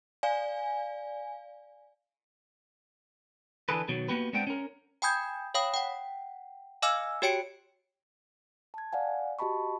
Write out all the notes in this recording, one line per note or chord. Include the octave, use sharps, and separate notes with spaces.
D5 F5 G#5
D3 E3 G#4 A4 B4
B2 D#3 F#3
A#3 B3 F#4 G4 B4
G#3 B3 C4 D4 F#5 G5
C#4 A#4
G5 G#5 B5 D#6 G6 G#6
C#5 F5 G5 B5 D#6
F#5 G5
D#5 F5 G#5 D6 E6 F6
F#4 G4 C#5 G5 C#7 D7
A5 G#6
D5 F5 F#5 G#5
F#4 G4 D#5 A5 B5 C#6